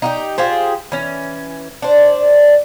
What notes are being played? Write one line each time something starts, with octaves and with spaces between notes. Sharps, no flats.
D#4 F4 G4
F4 G4 G#4 C5
E3 C#4
D4 C5